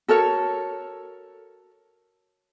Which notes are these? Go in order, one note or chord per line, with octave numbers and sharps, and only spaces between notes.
F#4 A4 A#4 C#5